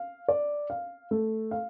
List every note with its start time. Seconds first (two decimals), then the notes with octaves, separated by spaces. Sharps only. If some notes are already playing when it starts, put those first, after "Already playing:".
Already playing: F5
0.28 D5
0.70 F5
1.11 A3
1.51 F5